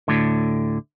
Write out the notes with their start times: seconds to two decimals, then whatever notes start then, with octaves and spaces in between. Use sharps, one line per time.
0.08 D2 A2 D3